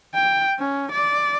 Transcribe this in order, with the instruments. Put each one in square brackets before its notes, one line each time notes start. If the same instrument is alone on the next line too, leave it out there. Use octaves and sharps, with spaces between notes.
[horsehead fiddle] G5
C#4
D5